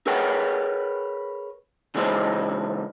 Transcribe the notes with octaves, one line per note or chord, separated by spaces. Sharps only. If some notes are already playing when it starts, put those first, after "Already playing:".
G#4 A#4 B4 C#5 F#5 G5
C#3 E3 G#3 C#4 D#4 C5